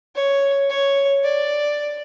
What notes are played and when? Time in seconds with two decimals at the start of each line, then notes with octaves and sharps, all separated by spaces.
0.15 C#5
0.70 C#5
1.24 D5